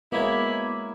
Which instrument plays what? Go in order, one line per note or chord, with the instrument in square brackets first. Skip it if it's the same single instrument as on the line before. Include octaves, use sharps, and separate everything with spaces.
[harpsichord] G#3 C#4 F#4 [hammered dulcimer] A#3 [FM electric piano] B3 B5 G#6 [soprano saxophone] E4